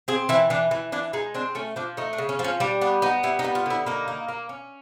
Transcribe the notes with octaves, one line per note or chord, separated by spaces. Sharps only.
C4 G#4
E3 E4
E3 D4
E3
E3 D4
G#3 D#4
C4 D4
A3 C#4
F3 D4
A3 D#4
D4
C#3
C#4
F3
C#4
G3 D4
B3 D4
B3 D#4
G3 E4
D#4
B3
F4
D3 E4
A#3 D#4
A#3
A#3
C#4